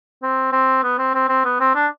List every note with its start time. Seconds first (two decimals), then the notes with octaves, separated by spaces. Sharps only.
0.22 C4
0.52 C4
0.83 B3
0.98 C4
1.14 C4
1.29 C4
1.45 B3
1.60 C4
1.75 D4